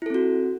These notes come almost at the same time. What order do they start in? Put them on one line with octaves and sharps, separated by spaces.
E4 A4 C4 F#4